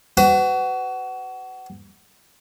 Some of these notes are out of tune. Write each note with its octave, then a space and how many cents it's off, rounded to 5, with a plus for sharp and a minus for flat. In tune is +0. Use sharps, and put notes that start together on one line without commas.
F#4 +25 B4 +40